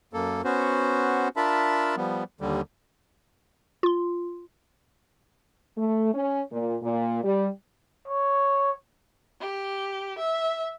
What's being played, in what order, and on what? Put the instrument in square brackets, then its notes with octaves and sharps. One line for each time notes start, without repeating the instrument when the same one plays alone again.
[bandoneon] F#2 A#3 A4
B3 C#4 F#4 C5
D4 F4 A#4 E5 A5 B5
F3 G3 B3
D#2 D3 G3
[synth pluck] F4 C6
[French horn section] A3
C#4
A#2
A#2
G3
[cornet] C#5
[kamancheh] G4
E5